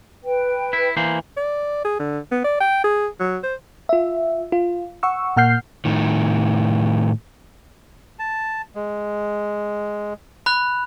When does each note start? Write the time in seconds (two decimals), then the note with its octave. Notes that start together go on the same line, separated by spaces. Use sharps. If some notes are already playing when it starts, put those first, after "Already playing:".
0.23 B4 G5
0.73 E4
0.97 E3 A#3 C5
1.37 D5
1.85 G#4
1.99 D3
2.31 B3
2.44 D5
2.60 G5
2.84 G#4
3.20 F#3
3.43 C5
3.89 F4 E5
4.52 F4
5.03 F#5 C#6 E6
5.36 A#2 A#3 F#5 F6 G6 C7
5.85 A2 D#3
8.19 A5
8.75 G#3
10.46 B5 F#6